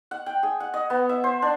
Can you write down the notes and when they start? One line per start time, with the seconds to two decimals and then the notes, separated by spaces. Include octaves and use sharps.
0.11 F#5
0.26 G5
0.43 G#4
0.60 F#5
0.74 D#5
0.90 B3
1.09 E5
1.24 C5
1.42 D4